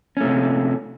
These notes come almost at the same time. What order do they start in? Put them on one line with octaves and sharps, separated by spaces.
C#4 A3 C3